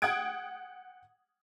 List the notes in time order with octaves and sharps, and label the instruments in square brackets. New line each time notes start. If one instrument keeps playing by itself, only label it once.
[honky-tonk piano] F#5 G5 D#6 G#6 D7